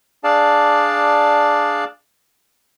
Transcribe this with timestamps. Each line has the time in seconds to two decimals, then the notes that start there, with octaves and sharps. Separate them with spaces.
0.24 D4 G#4 D5 F5 A5